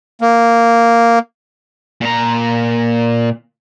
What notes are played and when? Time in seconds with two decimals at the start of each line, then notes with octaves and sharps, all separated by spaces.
0.21 A#3
2.01 A#2 A#5